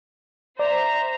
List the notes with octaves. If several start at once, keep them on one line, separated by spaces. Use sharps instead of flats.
C5 D5 E5 A#5